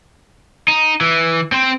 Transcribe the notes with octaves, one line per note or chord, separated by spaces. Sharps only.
D#4
E3
C4 C5